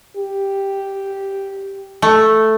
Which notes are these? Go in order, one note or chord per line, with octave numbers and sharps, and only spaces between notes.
G4
A3